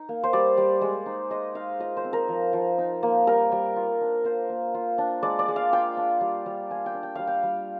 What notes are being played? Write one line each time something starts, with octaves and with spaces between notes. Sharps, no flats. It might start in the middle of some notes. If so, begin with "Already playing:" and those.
Already playing: D#4
A#3
C5
G3 D5
G3
G#3
D#4
G#3 D#5
D#4 F5
F4 D#5
C5
C4
A#4
F3
F3
D#4
A#3
G3 A#4
G3
F4
D4
A#3 C5
A#3
F4
D4
G#3 D5
D5
G#3
F5
F4 G5
D4
G3
G3
F4 G#5
G5
D4
G5
G3 F5
G5
G3